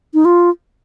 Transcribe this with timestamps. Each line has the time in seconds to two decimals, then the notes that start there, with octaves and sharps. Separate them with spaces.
0.14 D#4
0.25 F4